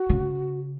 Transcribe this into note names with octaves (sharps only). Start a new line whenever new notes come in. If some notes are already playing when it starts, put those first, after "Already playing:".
Already playing: F#4
C#3